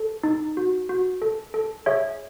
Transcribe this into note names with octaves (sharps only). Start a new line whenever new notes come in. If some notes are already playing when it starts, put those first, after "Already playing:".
Already playing: A4
D#4
F#4
F#4
A4
A4
G#4 C#5 E5